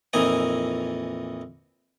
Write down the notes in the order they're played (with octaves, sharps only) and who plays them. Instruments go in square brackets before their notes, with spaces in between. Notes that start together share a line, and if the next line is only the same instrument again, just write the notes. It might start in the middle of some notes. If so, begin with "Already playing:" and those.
[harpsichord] F2 A#2 E3 D#4 G#5 D#6